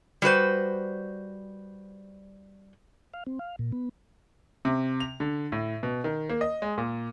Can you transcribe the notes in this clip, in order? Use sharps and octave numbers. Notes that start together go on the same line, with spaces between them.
G3 F#4 B4 C5
F5
C4
F5
A#2
B3
C3
F7
D3
A2
B2
D#3
A#3
D#5
G#3
A#2